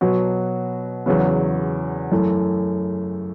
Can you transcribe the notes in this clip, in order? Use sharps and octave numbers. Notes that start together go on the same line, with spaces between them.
B2 F#3 B3 F#4
E2 C#3 F#3 B3
F#2 E3 A3